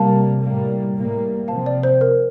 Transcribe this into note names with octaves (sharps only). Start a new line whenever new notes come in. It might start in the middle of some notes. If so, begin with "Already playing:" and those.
Already playing: C3 G3 A#3 F5 A5
A2 G3 A#3
A2 G3 A#3
C3 F3 C4 F5 A5
D5
C5
A#4